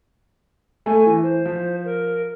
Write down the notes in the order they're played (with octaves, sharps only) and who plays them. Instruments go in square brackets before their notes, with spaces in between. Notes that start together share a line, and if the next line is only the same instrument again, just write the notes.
[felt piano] A3 [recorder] G#5
[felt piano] E3
[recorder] C5
[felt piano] F3
[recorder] A#4